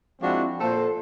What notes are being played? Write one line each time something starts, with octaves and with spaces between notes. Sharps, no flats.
F3 G#3 C4 D4 E4 F#4
A#2 A4 C5